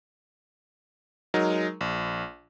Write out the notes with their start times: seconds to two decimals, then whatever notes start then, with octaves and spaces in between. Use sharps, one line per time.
1.34 F#3 G#3 D#4 A#4
1.81 A#1